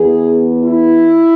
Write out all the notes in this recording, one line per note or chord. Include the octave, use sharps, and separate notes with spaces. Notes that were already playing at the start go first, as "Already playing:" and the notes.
Already playing: E2 E3 B3 G#4
E4